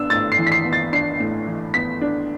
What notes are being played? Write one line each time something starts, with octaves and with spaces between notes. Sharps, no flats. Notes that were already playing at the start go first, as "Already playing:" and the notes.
Already playing: B3 D4 E6
A2 A6
C7
E3
B6
C7
B3
A6
D4 C7
A2
E3
B3 B6
D4